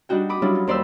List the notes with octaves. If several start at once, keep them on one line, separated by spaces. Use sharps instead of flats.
G3 D4 D#4 F#4 G5
B5 D6 D#6
F#3 G3 C#4 D4 E4 F4
F4
D#2 C5 D5 B5 D6 E6